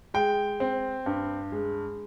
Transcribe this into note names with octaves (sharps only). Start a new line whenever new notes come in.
G#3 G5
C4
G2
G#3